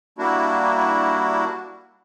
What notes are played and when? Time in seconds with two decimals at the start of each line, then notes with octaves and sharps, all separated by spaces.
0.18 G3 A#3 D4 E4 F#4